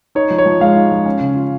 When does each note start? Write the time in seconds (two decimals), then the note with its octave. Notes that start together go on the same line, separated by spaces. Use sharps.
0.15 D#4 C#5
0.30 F3
0.38 C#5
0.45 F3
0.60 G#3 F5
0.76 D#4
0.91 F3
1.06 C#4
1.20 C#3
1.36 F4